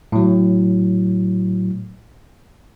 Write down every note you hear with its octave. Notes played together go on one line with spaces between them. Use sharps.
A2 F#3